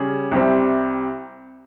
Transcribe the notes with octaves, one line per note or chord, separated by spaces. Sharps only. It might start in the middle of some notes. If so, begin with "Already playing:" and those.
Already playing: C#3 G3 C#4 G#4
C2 C3 G3 C4